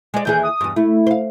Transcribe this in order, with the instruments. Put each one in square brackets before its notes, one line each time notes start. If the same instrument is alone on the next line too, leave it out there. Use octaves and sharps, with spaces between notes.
[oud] G#3 D5
[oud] D#2 E3 G#4 [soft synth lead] G6
[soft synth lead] D#6
[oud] E2 G2
[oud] A3 [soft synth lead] E4
[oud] C5 F5